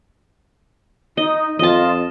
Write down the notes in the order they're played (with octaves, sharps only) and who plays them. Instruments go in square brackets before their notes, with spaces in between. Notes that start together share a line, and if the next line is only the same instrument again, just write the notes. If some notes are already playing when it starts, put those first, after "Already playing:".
[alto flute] D#4 [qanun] D#5
[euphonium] F2 [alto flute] F4 [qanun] D#5 A5